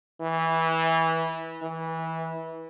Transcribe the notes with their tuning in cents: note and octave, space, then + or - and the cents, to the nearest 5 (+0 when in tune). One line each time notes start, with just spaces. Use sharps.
E3 -15
E3 -20